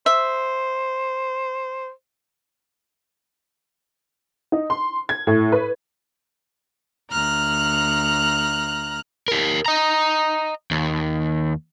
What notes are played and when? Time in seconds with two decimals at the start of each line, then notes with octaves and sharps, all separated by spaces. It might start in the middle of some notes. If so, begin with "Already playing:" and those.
0.06 C5 E5
4.52 D#4
4.70 C6
5.09 G#6
5.27 A2
5.52 B4
7.11 D2 A#5 F6 F#6
9.28 G4 A#4
9.66 D#5 A#5
10.71 D#2